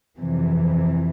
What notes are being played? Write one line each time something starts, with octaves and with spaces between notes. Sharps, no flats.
F2 C3 E3